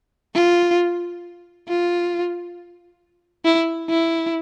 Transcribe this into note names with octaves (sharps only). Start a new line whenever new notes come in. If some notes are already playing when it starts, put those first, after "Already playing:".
F4
F4
E4
E4